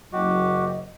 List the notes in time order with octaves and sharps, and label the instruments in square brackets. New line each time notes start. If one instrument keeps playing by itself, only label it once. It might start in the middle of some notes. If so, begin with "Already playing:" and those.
[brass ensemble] F#1 F#3 [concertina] F#4 G4 [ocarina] D#5